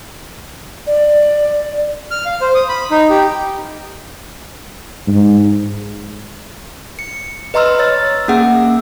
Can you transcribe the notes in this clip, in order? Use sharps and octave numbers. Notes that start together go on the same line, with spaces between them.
D5
F6
F5
C5
D#6
B5
D#4
G4
G#2
C#7
B4 D#5 A#5 C6 E6 F6
C#5 E6 A6
A#3 C#4 G#4 F#5 E6